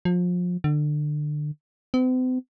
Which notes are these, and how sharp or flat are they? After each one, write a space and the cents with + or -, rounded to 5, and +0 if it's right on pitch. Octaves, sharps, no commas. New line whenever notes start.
F3 +30
D3 +25
C4 -45